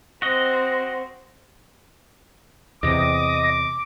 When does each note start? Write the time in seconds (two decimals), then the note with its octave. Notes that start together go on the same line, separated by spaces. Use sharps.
0.22 C4 F#4 D#5
2.83 E2 C3 D#5 D6 D#6 A#6